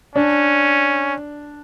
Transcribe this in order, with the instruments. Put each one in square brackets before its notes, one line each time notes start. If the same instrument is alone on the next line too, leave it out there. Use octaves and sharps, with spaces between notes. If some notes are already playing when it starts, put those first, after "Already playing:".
[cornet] C#4 [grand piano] D4